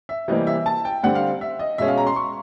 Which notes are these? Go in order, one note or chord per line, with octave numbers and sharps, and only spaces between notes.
E5
C3 E3 G3 A#3 D#5
E5
A5
G5
D3 G3 C4 F#5
F5
E5
D#5
B2 G#3 C#4 E5
F5
A#5
C6
C#6